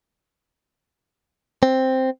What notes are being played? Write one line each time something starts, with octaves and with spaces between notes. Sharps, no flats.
C4